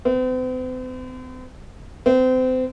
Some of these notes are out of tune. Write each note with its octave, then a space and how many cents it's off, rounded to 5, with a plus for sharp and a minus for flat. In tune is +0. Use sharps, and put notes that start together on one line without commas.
C4 -45
C4 -30